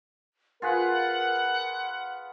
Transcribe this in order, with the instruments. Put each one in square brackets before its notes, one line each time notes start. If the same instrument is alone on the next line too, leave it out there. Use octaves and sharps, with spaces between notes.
[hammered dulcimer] F4 G#4 B4 [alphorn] A#4 [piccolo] F#5